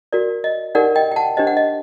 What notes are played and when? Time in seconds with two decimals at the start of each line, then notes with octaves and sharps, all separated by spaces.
0.13 F#4 A#4 D5
0.44 D#5
0.75 D#4 G4 A#4 D5 F#5
0.96 D#5 G5
1.12 G5
1.16 F#5 A5
1.37 D4 G4 C5 D#5
1.47 F#5
1.57 D#5